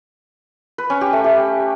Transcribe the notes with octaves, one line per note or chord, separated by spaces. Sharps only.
B4
C#4
G4
A3
G4